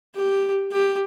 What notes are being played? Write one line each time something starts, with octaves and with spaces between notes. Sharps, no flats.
G4
G4